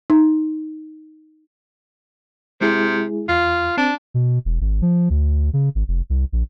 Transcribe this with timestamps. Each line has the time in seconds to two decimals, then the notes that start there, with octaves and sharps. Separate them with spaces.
0.10 D#4
2.61 C3 G#3 E4 G#4
3.29 E2 F4
3.77 C4 D4
4.14 B2
4.45 E1
4.61 G#1
4.82 F3
5.10 D2
5.53 C#3
5.75 G#1
5.88 F1
6.10 C2
6.32 A#1